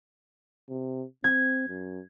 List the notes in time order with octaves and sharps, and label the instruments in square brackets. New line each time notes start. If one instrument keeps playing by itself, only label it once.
[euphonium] C3
[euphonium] C4 [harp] G#6
[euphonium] F#2